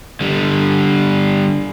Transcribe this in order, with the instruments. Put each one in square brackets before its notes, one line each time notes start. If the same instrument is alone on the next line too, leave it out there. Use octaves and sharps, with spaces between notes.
[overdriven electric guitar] D3 G3